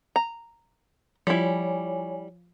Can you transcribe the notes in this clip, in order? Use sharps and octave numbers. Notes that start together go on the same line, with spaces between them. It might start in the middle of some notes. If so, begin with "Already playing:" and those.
A#5
F3 G3 E4 C#5 G#5